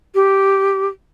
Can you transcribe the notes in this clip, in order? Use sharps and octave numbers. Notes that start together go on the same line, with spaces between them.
G4